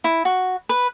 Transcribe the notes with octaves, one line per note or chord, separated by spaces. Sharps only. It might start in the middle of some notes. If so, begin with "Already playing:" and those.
E4
F#4
B4